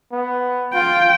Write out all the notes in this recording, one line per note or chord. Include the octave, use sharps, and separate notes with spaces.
B3
F4 G5